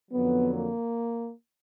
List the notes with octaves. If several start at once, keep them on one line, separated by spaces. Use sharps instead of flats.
F2 D3 F#3 B3
A#3